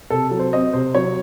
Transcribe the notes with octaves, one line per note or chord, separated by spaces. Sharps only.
C3 A4
F#3
C5
C4 D#5
C3 C5
F#3 C#5